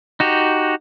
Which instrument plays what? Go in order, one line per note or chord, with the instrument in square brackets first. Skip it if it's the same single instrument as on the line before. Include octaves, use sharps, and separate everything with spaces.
[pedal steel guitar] D#4 F#4 G4